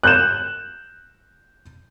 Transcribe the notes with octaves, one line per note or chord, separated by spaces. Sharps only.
F#6 G6 E7